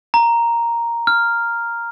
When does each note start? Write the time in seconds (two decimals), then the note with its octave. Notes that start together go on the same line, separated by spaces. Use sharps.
0.14 A#5
1.07 F6